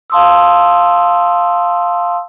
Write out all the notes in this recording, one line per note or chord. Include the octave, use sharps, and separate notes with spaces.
F5 A5 C6 D#6 E6